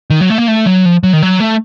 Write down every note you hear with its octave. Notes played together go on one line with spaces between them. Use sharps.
D#3
F#3
A3
A#3
A3
F#3
F3
F#3
D#3
F#3
A3